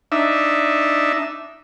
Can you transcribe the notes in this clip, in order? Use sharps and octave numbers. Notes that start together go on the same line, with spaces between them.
D4 D#4 E5